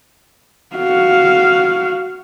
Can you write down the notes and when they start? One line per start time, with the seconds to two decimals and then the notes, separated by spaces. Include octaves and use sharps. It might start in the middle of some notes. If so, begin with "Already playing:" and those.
0.76 F#4 F5